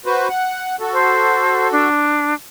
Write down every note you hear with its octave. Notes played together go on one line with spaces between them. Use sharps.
F#4 B4 C5
F#5
F#4 A4
C5
D4